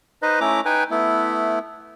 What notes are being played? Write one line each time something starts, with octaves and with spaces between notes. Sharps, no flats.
D#4 B4 C5 D#5
A3 C#4 E4 A#5 D6
D#4 B4 G5 G#5
A3 B3 E4